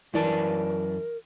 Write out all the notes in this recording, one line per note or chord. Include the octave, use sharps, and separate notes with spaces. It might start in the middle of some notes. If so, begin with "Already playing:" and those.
F#2 E3 A#4 D5 A5